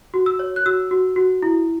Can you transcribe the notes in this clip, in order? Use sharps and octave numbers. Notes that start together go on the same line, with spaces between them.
F#4
E6
C#5
F#6
F#4 E6
F#4
F#4
E4